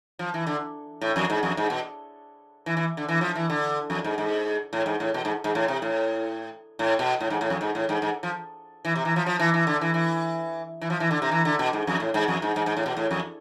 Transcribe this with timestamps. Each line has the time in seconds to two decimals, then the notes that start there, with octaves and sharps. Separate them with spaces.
0.19 F3
0.34 E3
0.47 D3
1.01 A2
1.16 F2
1.30 G#2
1.43 F2
1.57 G#2
1.70 B2
2.66 E3
2.77 E3
2.97 D3
3.09 E3
3.21 F3
3.35 E3
3.50 D3
3.90 F2
4.04 G#2
4.18 G#2
4.73 A2
4.86 G#2
5.00 A2
5.14 B2
5.25 G#2
5.44 G#2
5.55 A2
5.68 C3
5.82 A2
6.79 A2
6.99 B2
7.20 A2
7.30 G#2
7.41 A2
7.50 F2
7.61 G#2
7.75 A2
7.89 G#2
8.02 G#2
8.23 F3
8.85 E3
8.96 C3
9.05 E3
9.16 F3
9.26 F3
9.39 E3
9.54 E3
9.67 D3
9.81 E3
9.94 E3
10.81 E3
10.90 F3
11.00 E3
11.11 D3
11.22 C3
11.32 E3
11.45 D3
11.59 B2
11.73 G#2
11.87 F2
12.00 A2
12.14 G#2
12.28 F2
12.42 G#2
12.56 G#2
12.66 G#2
12.77 A2
12.86 B2
12.97 A2
13.11 F2